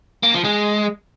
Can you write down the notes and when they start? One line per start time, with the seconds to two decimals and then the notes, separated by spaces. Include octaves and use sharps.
0.23 A#3
0.34 F3
0.45 G#3